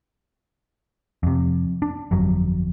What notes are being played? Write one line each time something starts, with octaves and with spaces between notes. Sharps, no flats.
F2 C3
D4
G1 F2 F#3